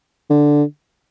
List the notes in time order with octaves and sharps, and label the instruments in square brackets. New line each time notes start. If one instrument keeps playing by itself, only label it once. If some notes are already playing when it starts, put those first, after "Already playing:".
[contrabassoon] D3